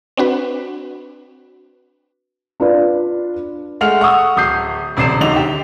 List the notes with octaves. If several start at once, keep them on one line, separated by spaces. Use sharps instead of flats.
C4 D4 F#4 B4
D4 F4 B4 D5
G#3 A3 F#5 F6 F7
F#5 C#6 D#6 E6
D1 D#6 G6 C7
D#1 C3 D4 C7 E7
D1 D3 D#4 F7
G4